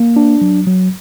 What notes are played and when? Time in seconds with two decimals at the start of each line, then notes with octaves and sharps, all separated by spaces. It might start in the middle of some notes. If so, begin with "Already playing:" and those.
Already playing: A#3
0.16 D4
0.41 F#3
0.67 F#3